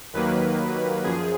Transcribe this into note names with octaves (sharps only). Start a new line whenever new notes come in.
D#2 D#3 F#3 A#3 B4
F#2 F3 G#4